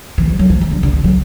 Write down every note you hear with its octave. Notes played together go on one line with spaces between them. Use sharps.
E3
F3
F#3
F3
E3
D3
D3
D#3
F#3